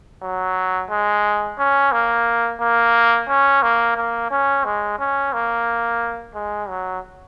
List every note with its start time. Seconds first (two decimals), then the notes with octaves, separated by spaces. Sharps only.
0.22 F#3
0.91 G#3
1.58 C#4
1.92 A#3
2.61 A#3
3.29 C#4
3.63 A#3
3.97 A#3
4.31 C#4
4.65 G#3
4.99 C#4
5.33 A#3
6.35 G#3
6.69 F#3